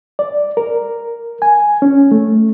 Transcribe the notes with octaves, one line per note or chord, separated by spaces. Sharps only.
D5
A#4
G#5
C#4
A3